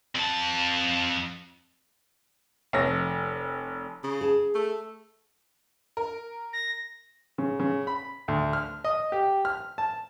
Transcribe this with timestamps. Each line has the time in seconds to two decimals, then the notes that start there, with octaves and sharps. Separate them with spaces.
0.15 F2 A5
2.73 F1 C#5 A#6
4.03 C#3
4.21 G#4 A5
4.54 A3
5.97 A#4
6.53 A#6
7.38 C#3
7.60 C#3
7.87 B5
8.28 D2
8.53 F6
8.84 D#5
9.12 G4
9.45 F6
9.78 A5